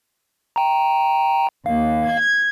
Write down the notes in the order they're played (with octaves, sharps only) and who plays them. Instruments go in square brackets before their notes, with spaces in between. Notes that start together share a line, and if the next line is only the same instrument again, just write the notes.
[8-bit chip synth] G5 A#5
[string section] D#2 [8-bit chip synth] F5
[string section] G#6